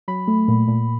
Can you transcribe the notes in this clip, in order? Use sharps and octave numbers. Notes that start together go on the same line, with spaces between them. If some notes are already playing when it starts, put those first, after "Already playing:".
F#3 B5
A3
A#2
A#2